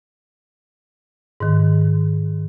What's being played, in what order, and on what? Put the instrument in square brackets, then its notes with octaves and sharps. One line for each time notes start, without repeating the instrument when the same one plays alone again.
[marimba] G#2 D#3